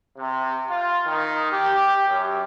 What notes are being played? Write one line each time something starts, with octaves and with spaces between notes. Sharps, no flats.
C3
F4
D#3
G4
F#2